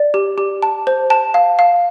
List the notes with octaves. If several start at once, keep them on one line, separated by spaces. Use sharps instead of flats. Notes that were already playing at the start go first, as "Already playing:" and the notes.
Already playing: D5
G4
G4
A5
C5
A5
F5
F5